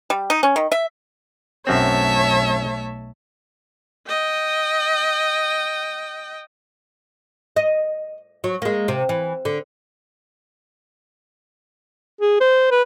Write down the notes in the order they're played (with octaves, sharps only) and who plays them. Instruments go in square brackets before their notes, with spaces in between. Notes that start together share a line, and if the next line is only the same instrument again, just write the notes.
[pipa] G3
D#4
C#4
D#3
E5
[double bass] B1 A3 [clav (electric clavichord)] F#2 C4 [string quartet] C#5 E5 A5
[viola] D#5 G5
[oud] D#5
F#3
G#3 A#3
C3
E3
D3
[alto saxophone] G#4
C5
B4